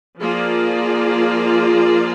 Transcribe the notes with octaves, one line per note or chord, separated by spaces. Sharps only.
F3 A#3 F4 G#4 D5